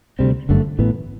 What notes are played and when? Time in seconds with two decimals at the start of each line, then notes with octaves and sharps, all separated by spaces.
0.19 D2 C3 G3 C4
0.49 G1 F#2 D3 A3
0.79 A1 A2 E3 B3